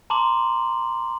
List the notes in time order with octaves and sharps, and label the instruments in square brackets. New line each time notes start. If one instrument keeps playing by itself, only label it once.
[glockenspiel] A5 A#5 C6 D6 F#7